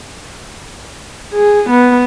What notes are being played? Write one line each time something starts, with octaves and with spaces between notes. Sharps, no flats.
G#4
B3